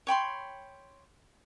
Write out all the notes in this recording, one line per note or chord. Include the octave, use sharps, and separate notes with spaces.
C#5 G5 B5 C6